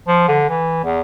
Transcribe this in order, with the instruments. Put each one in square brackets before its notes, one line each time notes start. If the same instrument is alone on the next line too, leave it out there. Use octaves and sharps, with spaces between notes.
[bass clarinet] F3
D3
E3
E2